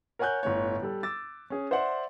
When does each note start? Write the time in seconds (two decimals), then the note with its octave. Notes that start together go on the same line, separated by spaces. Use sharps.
0.19 A#4 C#5 F#5 G#5 F#6 G6
0.43 G1 A2 C#5
0.83 G3 A4
1.03 D6 E6 A6
1.50 C#4 G#4
1.71 C5 D5 E5 F#5 C6